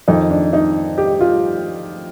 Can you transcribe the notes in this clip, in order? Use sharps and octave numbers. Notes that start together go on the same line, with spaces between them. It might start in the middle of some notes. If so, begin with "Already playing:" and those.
F2 D#3 D#4
D4
D#4
G4
F4